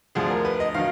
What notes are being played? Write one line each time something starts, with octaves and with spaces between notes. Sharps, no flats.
D2 D3 F3 G#4
A#4
B4
D#5
D#3 F#3 F5